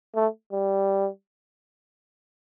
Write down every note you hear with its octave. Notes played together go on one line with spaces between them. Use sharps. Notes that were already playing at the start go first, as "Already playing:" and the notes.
A3
G3